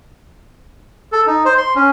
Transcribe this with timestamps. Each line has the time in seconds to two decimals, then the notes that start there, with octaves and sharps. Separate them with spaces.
1.12 A4
1.27 D#4
1.45 C5
1.58 C6
1.75 C#4